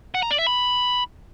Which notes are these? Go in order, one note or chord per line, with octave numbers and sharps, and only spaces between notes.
F#5
A#5
D5
E5
B5